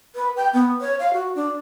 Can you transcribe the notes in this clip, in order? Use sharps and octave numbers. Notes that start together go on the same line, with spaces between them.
B4
G5
B3
C#5
F5
F#4
D4